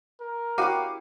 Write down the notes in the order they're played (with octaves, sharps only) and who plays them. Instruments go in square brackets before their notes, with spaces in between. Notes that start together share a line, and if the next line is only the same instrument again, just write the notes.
[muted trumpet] A#4
[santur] C#4 E4 G4 [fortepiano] F#4 [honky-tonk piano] F5 D6 D#7